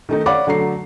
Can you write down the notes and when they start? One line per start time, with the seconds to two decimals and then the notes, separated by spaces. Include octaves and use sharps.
0.09 D#3 A3 D#4
0.26 C#5 D5 F5 F#5 B5 D6
0.47 D3 F#3 A3 A#5 C7